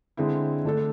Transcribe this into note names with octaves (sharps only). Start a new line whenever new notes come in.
D3 G#3 C4 E4
D3 A3 D4 A4